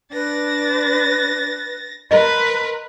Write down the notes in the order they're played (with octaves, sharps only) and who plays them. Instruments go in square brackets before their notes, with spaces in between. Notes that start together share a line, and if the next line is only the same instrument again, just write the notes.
[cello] D4 [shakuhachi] B4 [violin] A6 A#6
[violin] A#4 [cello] B4 [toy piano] D#5 [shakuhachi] C6